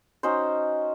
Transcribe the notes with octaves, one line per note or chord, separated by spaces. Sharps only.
C#4 D#4 F#4 C5